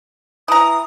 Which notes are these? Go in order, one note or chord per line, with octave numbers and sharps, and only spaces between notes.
E3 A#5 D#6